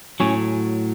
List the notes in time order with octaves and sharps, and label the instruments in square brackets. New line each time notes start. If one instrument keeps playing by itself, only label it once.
[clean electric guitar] A2 F#3 C#4